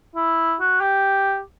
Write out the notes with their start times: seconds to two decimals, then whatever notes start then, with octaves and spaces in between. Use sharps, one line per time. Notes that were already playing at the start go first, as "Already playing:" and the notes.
0.15 E4
0.60 F#4
0.81 G4